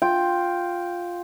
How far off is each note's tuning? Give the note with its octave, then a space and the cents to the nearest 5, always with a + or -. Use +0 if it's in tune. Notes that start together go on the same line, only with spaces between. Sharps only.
F4 +5 G5 +0